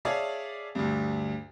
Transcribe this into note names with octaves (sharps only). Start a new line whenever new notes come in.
G#4 C#5 D5 E5 F5 A5
D2 G2